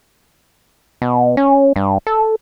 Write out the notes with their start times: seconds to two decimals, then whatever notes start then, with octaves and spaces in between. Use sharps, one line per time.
1.02 B2
1.37 C#4
1.76 G2
2.07 A4